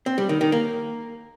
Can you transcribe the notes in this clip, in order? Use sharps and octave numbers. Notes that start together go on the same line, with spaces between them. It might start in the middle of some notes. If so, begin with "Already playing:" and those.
C4
G3
D#3
D#3
A#3